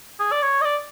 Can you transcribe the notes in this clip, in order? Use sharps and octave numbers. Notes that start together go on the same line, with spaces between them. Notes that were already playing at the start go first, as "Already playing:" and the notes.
G#4
D5
C#5
D#5
D5